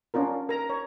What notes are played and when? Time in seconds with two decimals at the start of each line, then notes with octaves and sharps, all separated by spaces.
0.14 C#4 D4 F4 A#4
0.49 A#4 A#5
0.70 C#5